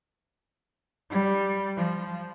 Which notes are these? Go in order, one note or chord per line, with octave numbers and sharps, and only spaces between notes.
G3
F3